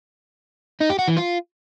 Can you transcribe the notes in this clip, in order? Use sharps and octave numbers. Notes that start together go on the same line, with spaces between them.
D#4
G4
F#4
E3
F4